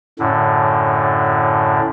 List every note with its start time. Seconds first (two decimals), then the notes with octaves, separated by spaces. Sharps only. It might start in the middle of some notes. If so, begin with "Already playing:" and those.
0.19 F#2 A2 D3